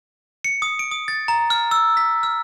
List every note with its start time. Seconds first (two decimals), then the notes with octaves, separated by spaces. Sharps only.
0.44 C#7
0.62 D#6
0.79 D7
0.91 D#6
1.08 A6
1.28 A#5
1.50 F6
1.71 E6
1.97 B6
2.23 F6